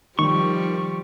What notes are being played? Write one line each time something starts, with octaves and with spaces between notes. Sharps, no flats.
D#3 F3 G3 C#6